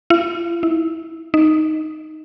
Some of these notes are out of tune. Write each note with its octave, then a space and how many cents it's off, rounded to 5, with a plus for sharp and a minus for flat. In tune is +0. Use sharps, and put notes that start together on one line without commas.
F4 -45
E4 -25
D#4 +0